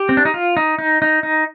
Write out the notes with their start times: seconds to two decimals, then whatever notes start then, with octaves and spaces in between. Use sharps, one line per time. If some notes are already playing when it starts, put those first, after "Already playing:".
Already playing: G4
0.09 C4
0.17 D4
0.25 D#4
0.34 F4
0.57 D#4
0.79 D#4
1.02 D#4
1.23 D#4